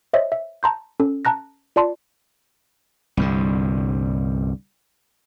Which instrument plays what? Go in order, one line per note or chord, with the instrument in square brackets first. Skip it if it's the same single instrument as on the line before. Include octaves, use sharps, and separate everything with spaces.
[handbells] C5 C#5 D#5 E5
E5
A5 A#5 C6 G6
C#4 A4
A5 A#5 F#6 A#6
F4 D5 A5 C6
[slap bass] C2 G2 D3